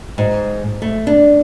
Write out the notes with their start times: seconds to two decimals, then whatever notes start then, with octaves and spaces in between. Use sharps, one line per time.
0.18 G#2
0.82 A3
1.07 D4